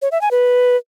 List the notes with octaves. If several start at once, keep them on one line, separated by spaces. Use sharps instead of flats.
C#5
E5
G#5
B4